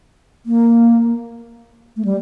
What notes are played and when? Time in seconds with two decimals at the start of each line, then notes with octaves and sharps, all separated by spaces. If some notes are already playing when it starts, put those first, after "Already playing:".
0.46 A#3
1.97 A3
2.05 G3